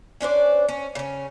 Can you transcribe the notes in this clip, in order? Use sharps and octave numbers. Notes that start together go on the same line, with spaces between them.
C#4 D4 C5 D5
C#4
C#3 C#4